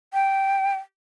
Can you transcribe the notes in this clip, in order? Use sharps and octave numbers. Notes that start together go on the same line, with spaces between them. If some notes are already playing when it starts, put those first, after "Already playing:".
G5